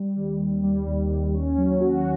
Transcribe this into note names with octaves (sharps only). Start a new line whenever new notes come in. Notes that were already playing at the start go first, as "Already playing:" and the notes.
Already playing: G3
D#2
D#2
G3
D#2
D#2
C#4
F#3
F#4